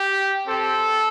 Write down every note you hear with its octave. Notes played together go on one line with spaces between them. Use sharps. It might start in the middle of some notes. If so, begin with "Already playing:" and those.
Already playing: G4
C4 G4 A4